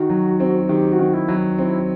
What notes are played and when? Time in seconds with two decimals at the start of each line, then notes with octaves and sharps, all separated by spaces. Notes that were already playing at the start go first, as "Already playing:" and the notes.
Already playing: D#3 F#4
0.10 F#3
0.40 C4
0.69 D#3 G4
0.92 F#4
0.99 D#3
1.14 E4
1.28 F#3
1.58 C4 E4